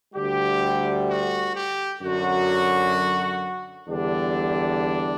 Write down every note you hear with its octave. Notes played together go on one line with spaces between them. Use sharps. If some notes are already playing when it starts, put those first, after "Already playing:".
D2 D3 G3 G4
F#4
G4
F#2 D3 F#3 F#4
E2 D3 G3 D4